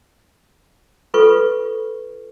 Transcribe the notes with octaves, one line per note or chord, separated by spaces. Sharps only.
F4 A4 B4 C#6